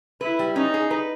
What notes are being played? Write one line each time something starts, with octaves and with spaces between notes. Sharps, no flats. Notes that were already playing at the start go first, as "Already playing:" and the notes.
E4 B4
G3
C#4 D#4
G#4
B4